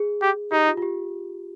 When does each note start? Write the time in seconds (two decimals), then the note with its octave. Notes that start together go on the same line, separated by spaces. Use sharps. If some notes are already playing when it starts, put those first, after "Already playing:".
Already playing: G#4
0.22 G4
0.52 D#4 G4
0.67 F4
0.77 F4
0.82 G4